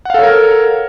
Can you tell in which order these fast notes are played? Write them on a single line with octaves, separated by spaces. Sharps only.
F#5 F5 A4 C#5 A#4